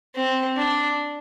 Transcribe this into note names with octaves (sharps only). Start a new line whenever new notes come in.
C4
D4